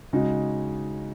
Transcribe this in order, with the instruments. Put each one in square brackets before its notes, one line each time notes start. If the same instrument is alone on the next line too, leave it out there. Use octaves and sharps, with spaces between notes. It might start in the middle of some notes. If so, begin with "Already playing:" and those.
[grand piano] C#3 G#3 D#4 F#4